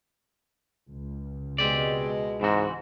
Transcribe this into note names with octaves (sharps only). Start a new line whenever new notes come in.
C#2
B2 G#3 C4 G4 D5
G#2 E3 C4 F#4